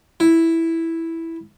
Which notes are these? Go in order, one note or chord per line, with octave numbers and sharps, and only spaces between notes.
E4